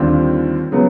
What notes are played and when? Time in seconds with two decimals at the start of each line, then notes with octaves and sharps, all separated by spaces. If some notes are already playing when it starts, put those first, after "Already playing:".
Already playing: D#2 D3 G3 C4 F4
0.72 C#3 F#3 B3